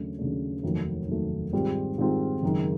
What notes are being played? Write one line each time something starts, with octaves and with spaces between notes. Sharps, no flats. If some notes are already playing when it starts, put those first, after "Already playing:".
Already playing: D#2 C#3 F#3 A3 D4
D#2 C#3 F#3 A3 D4
F1 D#2 D#3 F#3 A3
F1 D#2 D#3 F#3 A3
G#2 D#3 G3 C4 F4
G#2 D#3 G3 C4 F4
F#1 F#2 D#3 G#3